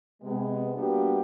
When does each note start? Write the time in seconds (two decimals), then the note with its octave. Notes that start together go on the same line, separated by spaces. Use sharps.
0.22 C3 G#3 B3
0.75 G3 A#3 B3 D4 F#4 G4